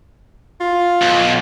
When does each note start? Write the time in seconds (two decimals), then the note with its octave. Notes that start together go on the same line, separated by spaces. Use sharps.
0.60 F4
1.02 B1